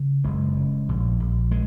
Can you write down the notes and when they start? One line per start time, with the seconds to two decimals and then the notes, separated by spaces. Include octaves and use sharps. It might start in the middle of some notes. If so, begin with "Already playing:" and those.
Already playing: C#3
0.24 F#1 G#3
0.57 C#3
0.89 A#1
1.20 A#1
1.51 G#3